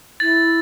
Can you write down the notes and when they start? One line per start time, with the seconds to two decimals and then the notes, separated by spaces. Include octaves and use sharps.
0.20 E4 A6